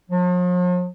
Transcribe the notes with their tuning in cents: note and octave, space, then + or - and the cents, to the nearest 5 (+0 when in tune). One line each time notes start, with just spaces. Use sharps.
F3 +45